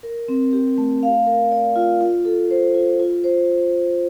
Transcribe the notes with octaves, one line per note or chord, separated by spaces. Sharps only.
A#4
C4
G4
A3
F5
A#4
D5
F4
F4
A4
C5
F4
F4
C5